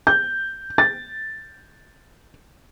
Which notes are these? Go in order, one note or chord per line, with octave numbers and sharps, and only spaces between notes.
G6
A6